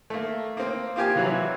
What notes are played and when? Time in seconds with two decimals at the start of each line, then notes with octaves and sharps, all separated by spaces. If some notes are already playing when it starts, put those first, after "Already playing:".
0.10 A3 A#3
0.57 A#3 C4
0.96 A#3 F4 G4 G#5
1.15 C3 E3 F#3